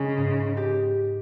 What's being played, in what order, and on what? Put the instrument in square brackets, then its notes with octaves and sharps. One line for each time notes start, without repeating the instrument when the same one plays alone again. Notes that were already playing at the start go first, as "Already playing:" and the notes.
Already playing: [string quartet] C#3 [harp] G#3
[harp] G#2
G4